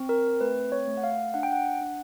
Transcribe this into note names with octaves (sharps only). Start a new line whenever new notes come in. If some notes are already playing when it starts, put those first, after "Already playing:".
Already playing: C4
A#4
A3 B4
C#5
A3
F#5
F5
D4 F#5
G5
F#5
D4